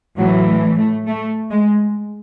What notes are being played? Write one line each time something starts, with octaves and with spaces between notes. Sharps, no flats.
A2 E3 F#3
A3
A3
G#3